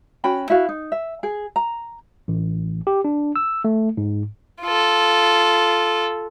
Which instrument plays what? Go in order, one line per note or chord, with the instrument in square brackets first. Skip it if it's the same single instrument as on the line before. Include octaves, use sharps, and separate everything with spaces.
[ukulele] C#4 F#4 G5 B5
E4 F#4 F5
D#4
E5
G#4
A#5
[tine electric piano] A1
G4
D4
E6
A3
G#2
[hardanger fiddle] F4 A4